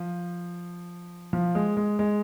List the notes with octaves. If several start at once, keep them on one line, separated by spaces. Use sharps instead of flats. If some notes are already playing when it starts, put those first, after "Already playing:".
Already playing: F3
F3
G#3
G#3
G#3